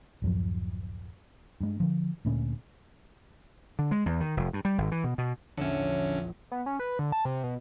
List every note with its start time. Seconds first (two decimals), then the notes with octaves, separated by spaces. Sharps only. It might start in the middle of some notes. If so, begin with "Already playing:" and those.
0.22 D1 F#2 F3
1.61 G2 G#3
1.80 D3 F3
2.25 D2 A#2 C#4
3.79 D3
3.91 G#3
4.06 E2
4.20 D#3
4.37 F1
4.53 G2
4.65 G3
4.78 G#1
4.92 E3
5.04 B2
5.18 B2
5.58 A#1 E2 D3 C#4 C#5 E5
6.51 B3
6.66 C#4
6.79 B4
6.99 D3
7.12 A5
7.25 C3
7.43 B2